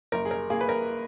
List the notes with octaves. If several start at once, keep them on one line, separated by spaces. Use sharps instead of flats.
F#1 A#4
G#4
A#4
A#3 G#4
B4
A#4